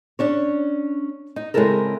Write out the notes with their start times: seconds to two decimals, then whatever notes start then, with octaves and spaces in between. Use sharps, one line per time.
0.19 C#4 D4 C#5
1.36 D#4
1.54 C#3 G#3 C4 E4 A4 A#4